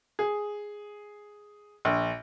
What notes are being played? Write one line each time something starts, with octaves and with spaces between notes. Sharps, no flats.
G#4
A#1